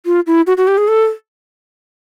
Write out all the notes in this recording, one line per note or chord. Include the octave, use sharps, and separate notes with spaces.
F4
E4
F#4
F#4
G4
G#4
A4